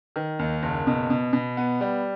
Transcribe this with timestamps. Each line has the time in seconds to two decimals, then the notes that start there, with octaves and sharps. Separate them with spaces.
0.16 D#3
0.39 D#2
0.63 F#1
0.87 B2
1.10 B2
1.33 B2
1.57 B3
1.81 G3